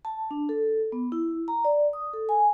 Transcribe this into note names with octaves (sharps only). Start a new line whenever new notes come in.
A5
D4
A4
B3
E4
A#5
D5
D#6
A4
G#5